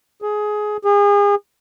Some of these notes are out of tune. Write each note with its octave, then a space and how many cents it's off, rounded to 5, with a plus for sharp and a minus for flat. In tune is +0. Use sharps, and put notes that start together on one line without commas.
G#4 +15
G#4 -35